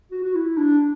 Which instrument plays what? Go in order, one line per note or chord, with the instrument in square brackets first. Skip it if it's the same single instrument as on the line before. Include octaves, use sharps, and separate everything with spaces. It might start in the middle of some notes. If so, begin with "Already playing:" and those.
[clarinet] F#4
F#4
E4
D4